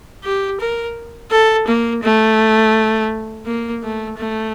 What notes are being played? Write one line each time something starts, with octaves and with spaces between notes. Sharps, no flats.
G4
A#4
A4
A#3
A3
A#3
A3
A3